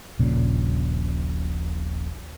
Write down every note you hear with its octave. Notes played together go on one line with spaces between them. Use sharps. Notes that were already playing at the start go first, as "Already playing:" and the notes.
D#1 A#1 A#2 C#3